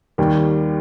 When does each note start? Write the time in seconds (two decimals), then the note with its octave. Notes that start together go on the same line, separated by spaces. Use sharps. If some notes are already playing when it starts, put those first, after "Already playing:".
0.18 D#2 D#3 G3